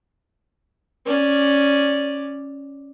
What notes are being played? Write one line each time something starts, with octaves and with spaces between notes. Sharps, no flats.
C#4 D5